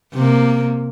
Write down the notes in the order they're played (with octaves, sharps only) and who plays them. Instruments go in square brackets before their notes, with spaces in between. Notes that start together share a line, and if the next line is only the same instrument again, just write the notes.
[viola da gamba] C3 A#3